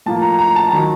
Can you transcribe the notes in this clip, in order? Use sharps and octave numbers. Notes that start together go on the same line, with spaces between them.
A2 F3 A#3 A5
A#5
A#5
A5
D#3 F#3 A#5